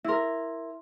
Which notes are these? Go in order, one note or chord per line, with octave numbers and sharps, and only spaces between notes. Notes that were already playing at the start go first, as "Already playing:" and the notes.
E4 A#4 E5 C6